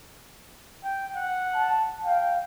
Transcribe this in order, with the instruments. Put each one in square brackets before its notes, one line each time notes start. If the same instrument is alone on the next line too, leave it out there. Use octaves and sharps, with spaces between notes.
[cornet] G5
F#5
[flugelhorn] A5
[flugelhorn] F5 [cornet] G5